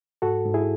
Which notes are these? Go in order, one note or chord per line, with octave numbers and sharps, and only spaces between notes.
G#2 F#4 A4
G#2
E4 G#4